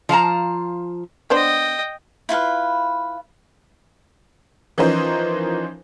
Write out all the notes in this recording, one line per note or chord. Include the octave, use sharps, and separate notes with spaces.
F3 F5 A5 A#5
B3 D4 C5 D#5 G5
E4 F4 B4 F5
E3 F3 C#4 D#4 A#4 C5